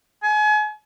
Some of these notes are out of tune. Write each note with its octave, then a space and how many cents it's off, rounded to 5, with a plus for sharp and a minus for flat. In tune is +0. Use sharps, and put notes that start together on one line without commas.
G#5 +35